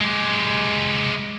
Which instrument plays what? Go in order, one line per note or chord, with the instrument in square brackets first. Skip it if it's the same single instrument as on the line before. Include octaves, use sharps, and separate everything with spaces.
[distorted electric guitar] G#3 G4